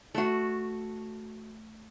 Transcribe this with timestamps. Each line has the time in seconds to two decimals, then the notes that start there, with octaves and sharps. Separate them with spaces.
0.14 A3 F#4